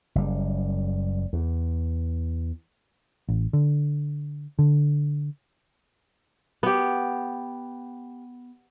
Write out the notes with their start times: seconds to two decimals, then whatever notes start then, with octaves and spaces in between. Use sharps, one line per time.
0.15 F#1 G3
1.33 E2
3.28 A1
3.53 D3
4.59 D3
6.63 B3 G4